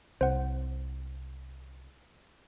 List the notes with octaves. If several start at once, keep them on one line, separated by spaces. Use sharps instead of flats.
C2 C5 F#5